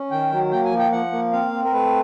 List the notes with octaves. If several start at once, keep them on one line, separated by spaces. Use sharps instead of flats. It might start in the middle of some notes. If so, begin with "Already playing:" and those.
Already playing: C#4
D#3 G5
F#3
A#3 G5
G#5
F3
G5
F3 F#5
A#3
C4 F5
C4
A#4
A3 B4